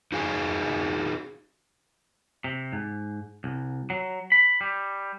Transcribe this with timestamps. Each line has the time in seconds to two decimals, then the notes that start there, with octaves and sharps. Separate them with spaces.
0.12 D#4 F#4 G#4 F5 G#5
2.44 C3
2.73 G#2
3.44 C2
3.90 F#3
4.32 B5
4.61 G3